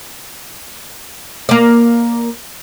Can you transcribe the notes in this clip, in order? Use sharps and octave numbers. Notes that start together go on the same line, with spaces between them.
A#3 D5